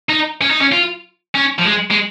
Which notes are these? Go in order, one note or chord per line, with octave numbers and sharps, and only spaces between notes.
D#4
C#4
D#4
C#4
F4
C#4
F3
G#3
G#3